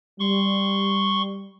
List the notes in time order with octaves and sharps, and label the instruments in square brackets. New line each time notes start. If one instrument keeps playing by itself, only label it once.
[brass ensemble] G3 [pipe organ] C6 C#6